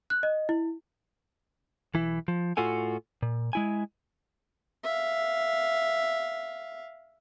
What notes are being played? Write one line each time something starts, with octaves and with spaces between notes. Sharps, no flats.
F#6
D#5
E4
B1 E3 E4
F3
A2 F4 F#4 A4 G#5
A#2
G#3 E4 G#5
E5 F5